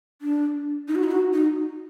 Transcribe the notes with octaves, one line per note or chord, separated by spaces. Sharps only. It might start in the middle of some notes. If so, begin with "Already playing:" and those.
D4
D#4
F#4
D#4
F#4
D#4